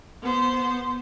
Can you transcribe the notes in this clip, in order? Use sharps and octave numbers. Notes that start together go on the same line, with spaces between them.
B3 C5